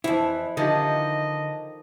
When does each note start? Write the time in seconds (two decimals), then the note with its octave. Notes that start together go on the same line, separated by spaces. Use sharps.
0.04 F2 E3 E4
0.57 D3 D#3 F3 G4 D#5